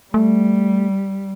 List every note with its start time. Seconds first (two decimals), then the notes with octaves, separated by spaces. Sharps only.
0.14 G3 A3